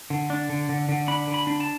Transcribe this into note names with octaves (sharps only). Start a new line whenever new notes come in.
D3
D4
D3
D3
D3
D4 B5
D3
B5
D4
A5